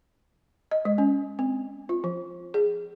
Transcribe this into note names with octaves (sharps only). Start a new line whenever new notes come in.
D#5
G#3
C#4
C4
F4
F3
G#4